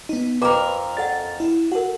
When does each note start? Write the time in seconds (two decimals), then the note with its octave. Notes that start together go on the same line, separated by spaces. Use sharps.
0.09 B3 D#4
0.42 F2 A#4 B4 A#5 D6
0.97 A4 D5 F#5 A6
1.40 E4
1.72 F#4 A4 A#4 F#5